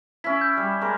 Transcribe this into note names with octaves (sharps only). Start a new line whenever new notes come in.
C#4 E4 B6
G6
G3
G#3 A#4 D6